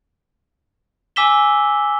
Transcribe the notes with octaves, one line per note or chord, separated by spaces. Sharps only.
G#5 D6 E6 B6 E7 G7